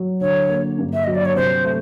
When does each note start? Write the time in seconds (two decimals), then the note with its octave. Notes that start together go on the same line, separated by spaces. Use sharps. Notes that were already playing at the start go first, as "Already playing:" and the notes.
Already playing: F#3
0.21 D3 C#5
0.49 A#3
0.78 G2
0.93 E5
1.04 F#3 D#5
1.15 D5
1.25 C#5
1.36 C3 C5
1.65 A3